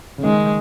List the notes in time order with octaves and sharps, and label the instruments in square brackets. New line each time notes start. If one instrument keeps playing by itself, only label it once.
[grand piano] C#3
[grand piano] D#3 [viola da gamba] G#3